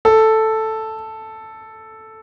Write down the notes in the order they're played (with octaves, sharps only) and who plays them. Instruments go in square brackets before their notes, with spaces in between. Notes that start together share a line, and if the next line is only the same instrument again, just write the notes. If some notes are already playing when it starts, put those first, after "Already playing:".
[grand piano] A4